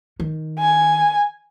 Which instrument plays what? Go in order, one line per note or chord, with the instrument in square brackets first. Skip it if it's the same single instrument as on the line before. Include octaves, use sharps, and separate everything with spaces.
[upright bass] D#3
[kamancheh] G#5